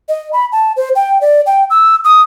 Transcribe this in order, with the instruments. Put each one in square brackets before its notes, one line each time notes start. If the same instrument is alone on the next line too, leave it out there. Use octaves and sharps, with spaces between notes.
[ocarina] D#5
B5
A5
C5
G5
D5
G5
E6
D#6